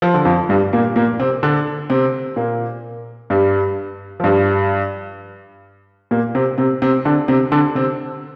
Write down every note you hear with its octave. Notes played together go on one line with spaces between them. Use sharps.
F3
D3
F2 F3
G2 G3
A#2 A#3
A#2 A#3
C3 C4
D3 D4
C3 C4
A#2 A#3
G2 G3
F3
G2 G3
A#2 A#3
C3 C4
C3 C4
C3 C4
D3 D4
C3 C4
D3 D4
C3 C4